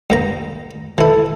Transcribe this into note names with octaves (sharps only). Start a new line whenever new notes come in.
G2 A#3 A#5
E3 E4 A4